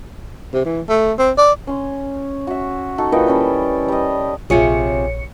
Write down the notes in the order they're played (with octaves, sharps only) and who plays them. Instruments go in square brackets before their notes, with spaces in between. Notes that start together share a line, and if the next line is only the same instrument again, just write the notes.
[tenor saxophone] C3
E3
A3
C4
D5
[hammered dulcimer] C#4 C6
F#4 E5
D#4 F#4 A4
A#2 E3 D#5 G5
G3 C#4 A4
G3 D5 D#5
[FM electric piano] A#1 C#5 C#7 [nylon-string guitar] C3 F4 G#4